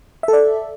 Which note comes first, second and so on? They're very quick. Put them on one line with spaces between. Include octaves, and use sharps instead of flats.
E5 A4 D5